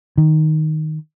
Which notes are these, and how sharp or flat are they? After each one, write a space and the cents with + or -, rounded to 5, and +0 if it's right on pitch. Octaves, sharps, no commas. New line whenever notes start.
D#3 +0